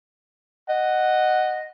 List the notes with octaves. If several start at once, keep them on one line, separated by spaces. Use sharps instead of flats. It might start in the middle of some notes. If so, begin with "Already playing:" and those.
D#5 F#5